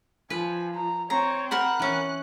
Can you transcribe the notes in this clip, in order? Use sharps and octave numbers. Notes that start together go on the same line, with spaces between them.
F3 B4 G#5
A#5
C4 C#5 A#5
A#4 F#5 B5 F#6
E3 C#4